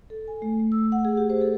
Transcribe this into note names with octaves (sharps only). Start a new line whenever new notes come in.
A4
G#5
A3
A3
E6
F#5
G#4
G4
C5
A4